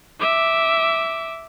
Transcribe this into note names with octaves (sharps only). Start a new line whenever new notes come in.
E5 D6